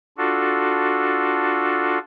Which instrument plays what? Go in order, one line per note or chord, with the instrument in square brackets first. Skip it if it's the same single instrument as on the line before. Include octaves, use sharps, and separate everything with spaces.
[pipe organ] D4 F4 F#4 A4